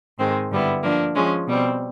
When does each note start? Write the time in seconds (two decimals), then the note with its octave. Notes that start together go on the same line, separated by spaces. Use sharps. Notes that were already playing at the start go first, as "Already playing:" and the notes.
0.18 G#2 D#3 G#3 C4
0.51 G2 D3 G3 B3 E4
0.83 F3 A#3 D4
1.15 F3 G#3 C#4
1.47 B2 G3 C4